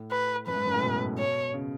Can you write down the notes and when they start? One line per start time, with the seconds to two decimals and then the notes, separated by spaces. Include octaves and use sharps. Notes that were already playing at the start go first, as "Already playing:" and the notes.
Already playing: A2
0.11 B4
0.47 F#2 B4
0.56 G#2
0.65 F#2
0.73 A2
0.82 B2
1.18 C#5
1.54 C#3